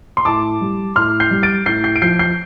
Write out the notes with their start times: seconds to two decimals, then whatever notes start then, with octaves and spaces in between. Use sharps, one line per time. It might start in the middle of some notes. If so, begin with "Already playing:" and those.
0.17 C6
0.25 A2 A5 D6
0.61 G3
0.96 A2 C6 F6
1.20 G6 C7
1.31 G3
1.43 A6 D7
1.66 A2 G6 C7
1.84 G6 C7
1.96 D7
2.02 F3 G6 C7
2.19 G6 C7